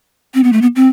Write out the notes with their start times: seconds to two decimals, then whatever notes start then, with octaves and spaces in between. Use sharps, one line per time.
0.34 C4
0.43 B3
0.53 A3
0.62 B3
0.76 C4